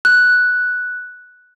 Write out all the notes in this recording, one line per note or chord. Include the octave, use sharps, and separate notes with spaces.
F#6